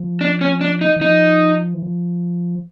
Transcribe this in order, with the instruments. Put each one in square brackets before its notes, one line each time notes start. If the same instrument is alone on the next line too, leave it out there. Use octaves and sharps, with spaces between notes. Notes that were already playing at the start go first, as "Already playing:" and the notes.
Already playing: [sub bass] F3
[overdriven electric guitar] D4
C#4
D4
D#4
[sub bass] E3
[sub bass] F3 [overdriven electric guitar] D#4
[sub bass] E3
F3